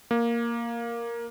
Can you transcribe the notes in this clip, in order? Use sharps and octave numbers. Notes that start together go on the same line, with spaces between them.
A#3